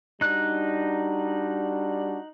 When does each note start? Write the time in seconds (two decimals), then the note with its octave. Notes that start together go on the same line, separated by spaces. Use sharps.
0.21 G3 D4 D#4 F#4 F#6